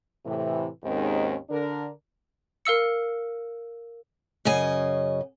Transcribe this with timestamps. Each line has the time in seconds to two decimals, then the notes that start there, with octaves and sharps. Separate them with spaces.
0.25 A2 C3 E3
0.84 D#2 G#2 D#3 G#3 C4 C#4
1.50 D3 D4 A#4
2.65 A#4 F5 E6 C#7
4.45 F#2 C#3 D#5 G#5